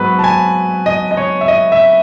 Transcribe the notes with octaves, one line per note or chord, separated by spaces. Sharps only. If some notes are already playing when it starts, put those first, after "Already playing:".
Already playing: G#2 F#3 B3 B4
A5
G#5
D#5
D#5
C#5
E5
D#5
E5